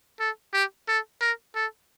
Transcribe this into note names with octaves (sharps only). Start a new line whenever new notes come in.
A4
G4
A4
A#4
A4